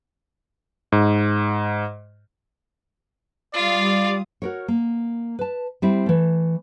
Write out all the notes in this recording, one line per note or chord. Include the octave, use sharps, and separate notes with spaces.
G#2
G3 F4 D5 F5 D#6
F#4 A#4 C#5
A#3
B4 A5
G3 C4 E4
E3 A3